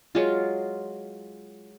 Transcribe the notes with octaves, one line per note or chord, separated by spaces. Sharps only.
F#3 G#3 F4